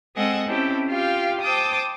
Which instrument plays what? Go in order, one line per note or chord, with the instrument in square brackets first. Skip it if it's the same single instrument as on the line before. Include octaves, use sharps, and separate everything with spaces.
[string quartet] G#3 C4 A4 D#5 F#5 G#5
C4 C#4 E4 G4 A4
F4 G4 F5 G5
C5 G5 A5 D6 D#6